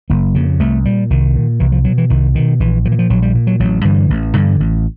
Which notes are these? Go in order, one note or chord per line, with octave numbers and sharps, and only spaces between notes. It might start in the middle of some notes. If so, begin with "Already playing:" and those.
F#1 A#3
F2 C#3
C2 A3
A#2 G3
C2 D#3
A#2
C2 E3
F3
B2 F#3
E3
C2 D#3
B2 D#3
A#1 E3
A#2 F3
E3
F3
A#1 F#3
G3
A#2
F#3
A1 F#3
G2 D3 E3
A1
G2 D3
A1